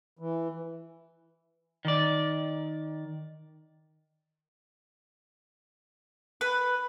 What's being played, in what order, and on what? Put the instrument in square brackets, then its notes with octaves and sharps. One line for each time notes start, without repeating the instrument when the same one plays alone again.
[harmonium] E3
[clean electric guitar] D#3 D5
[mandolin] B4